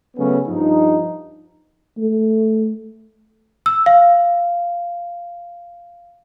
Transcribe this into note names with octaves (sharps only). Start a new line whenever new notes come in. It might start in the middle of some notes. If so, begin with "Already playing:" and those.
C#3 F#3 A3 B3 C#4
G2 F3 D#4
A3
E6
F5